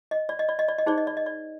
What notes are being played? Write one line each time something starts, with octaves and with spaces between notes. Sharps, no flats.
D#5
D5
D#5
D5
D#5
D5
D#5
D#4 G#4 C5 D5
D#5
D5
D#5
D5